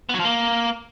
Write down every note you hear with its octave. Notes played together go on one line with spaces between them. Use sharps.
B3
F#3
F3
A#3